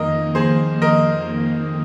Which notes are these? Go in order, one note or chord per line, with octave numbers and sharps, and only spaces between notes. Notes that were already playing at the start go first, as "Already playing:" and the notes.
Already playing: F2 D#3 A#3 A#4 D#5
G#4 C5
A#4 D#5